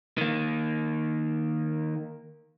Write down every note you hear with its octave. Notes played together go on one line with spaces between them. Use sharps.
D#3 A#3